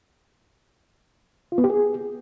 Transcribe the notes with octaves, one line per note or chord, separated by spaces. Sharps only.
F4
B3
G4
G#4